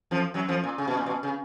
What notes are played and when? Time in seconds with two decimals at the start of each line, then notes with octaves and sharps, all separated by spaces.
0.11 F2 F3
0.34 F#2 F#3
0.48 F2 F3
0.64 A#2
0.78 C#3
0.88 B2
0.97 A#2
1.06 B2
1.23 C#3